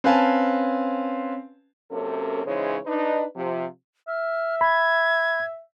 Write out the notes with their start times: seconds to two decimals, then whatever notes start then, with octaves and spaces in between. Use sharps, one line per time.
0.04 C4 C#4 B4 F5 G#5 A5
1.90 F#2 C3 A#3 C#4 A4
2.46 C#3 E3 G#3 D#4 C5 C#5
2.86 D4 D#4 B4
3.36 C3 F3
4.08 E5 F6
4.61 B5 G#6